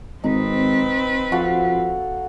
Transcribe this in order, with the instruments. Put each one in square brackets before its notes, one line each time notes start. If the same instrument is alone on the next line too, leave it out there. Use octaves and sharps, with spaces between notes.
[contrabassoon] G#1 [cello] C4 B4 [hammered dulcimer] D#4
[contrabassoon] F3 [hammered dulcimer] F#4 A4 F5